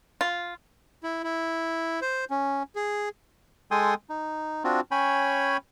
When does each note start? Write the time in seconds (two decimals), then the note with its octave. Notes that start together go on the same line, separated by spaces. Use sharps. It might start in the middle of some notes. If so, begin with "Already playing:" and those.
0.21 F4
1.03 E4
1.24 E4
2.02 C5
2.30 C#4
2.76 G#4
3.71 G#3 A4 G5 G#5 C6 D#6
4.10 D#4
4.64 C4 D4 F4 F#4
4.91 C#4 C#5 G5 G#5 B5